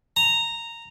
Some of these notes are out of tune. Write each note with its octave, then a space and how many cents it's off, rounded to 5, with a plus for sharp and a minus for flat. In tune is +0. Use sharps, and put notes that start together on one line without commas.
A#5 -10